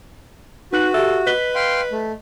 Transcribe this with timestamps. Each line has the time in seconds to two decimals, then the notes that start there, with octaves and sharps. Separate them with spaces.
0.73 D#4 F#4 B4 F#6 F#7
0.94 G4 A4 E5
1.27 B4 D#5 B6 G7
1.55 F5 G5 C6
1.92 A3